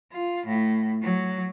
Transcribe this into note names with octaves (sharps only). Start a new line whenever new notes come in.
F4
A2
F#3